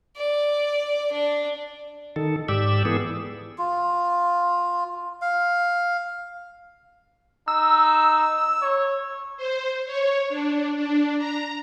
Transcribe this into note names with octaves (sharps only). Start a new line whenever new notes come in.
D5
D4
D#3 A4
G#2 G4 D5 E6
E3 B3 G#4 A4
F4
F5
D#4 E6
C#5
C5
C#5
D4
D4
A#5